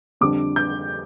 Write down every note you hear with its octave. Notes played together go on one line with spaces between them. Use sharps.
F2 D3 G3 D4 D6
G6